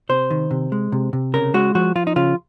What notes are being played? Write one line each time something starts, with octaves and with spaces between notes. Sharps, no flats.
C3 C5
D#3
C3
G#3
C3
C3
C#3 A#4
G#3 F#4
F3 F#4
F3 F4
D#4
C#3 F4